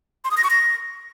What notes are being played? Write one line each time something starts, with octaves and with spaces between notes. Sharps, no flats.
C6
D#6
A#6
C#6
A#6